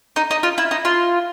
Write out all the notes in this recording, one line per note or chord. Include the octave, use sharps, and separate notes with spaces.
D#4
D#4
F4
E4
D#4
F4